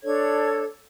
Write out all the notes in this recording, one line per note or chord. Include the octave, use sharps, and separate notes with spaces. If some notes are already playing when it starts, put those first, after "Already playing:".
D4 A4 C#5 G#6